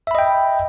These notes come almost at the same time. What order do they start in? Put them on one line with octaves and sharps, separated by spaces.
E5 B5 D#5 G5